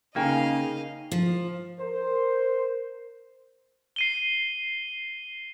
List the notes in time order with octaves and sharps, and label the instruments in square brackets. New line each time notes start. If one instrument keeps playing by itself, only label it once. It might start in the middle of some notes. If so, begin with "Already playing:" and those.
[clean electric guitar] C#3 A#3 [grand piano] D#4 G5 G#5 [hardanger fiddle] D#5 F5
[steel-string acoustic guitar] F3
[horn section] A#4 C5
[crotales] C7 D#7 G7